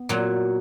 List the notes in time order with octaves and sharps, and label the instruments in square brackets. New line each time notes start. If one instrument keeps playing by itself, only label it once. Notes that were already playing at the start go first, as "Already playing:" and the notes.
Already playing: [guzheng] B3
A#2 F#3